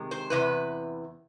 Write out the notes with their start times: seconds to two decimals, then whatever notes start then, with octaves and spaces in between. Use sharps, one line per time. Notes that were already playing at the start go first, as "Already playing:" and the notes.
Already playing: C3 D#3 G#3
0.11 C5
0.30 E2 C3 B4